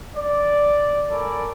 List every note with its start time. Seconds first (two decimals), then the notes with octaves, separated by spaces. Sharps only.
0.16 D5
1.11 A4 A#4 C#5 D5 G#5 B5